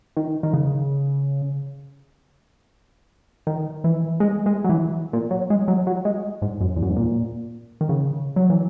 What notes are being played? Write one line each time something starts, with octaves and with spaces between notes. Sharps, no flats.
D#3
D#3
C#3
D#3
E3
G#3
G#3
F#3
E3
A#2
F#3
G#3
F#3
F#3
G#3
G#2
F#2
E2
F#2
G#2
A#2
D#3
C#3
F#3
E3